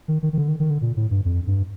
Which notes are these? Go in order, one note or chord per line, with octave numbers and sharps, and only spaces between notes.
D#3
D#3
D#3
D3
D#3
D#3
D3
A#2
A2
G2
F2
G2